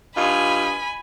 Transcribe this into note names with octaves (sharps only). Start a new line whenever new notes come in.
G2 F4 D#5 G#5 B5